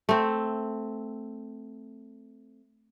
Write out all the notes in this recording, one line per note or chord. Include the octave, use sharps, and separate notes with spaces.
A3 C4